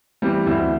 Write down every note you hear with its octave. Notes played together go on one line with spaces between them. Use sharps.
E3 G3 C4
D2 C4 E4